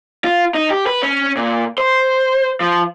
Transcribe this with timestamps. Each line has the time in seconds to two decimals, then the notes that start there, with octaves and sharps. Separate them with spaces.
0.24 F4
0.55 D#4
0.70 G4
0.87 B4
1.02 C#4
1.37 A#2
1.78 C5
2.61 F3